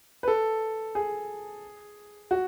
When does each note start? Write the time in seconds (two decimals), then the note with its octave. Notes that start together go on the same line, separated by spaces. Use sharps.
0.23 B4
0.28 A4
0.95 G#4
2.31 F#4